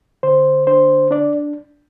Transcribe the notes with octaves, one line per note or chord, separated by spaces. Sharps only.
D3 C5
D4 C5
D4 D5